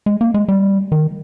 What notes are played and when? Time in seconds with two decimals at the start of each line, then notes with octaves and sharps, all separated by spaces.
0.06 G#3
0.21 A#3
0.34 G#3
0.48 G3
0.92 D#3